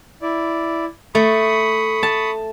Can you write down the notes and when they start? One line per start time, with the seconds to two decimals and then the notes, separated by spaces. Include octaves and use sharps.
0.22 E4 D5
1.15 A3 B5 C#6 D#6
2.03 A5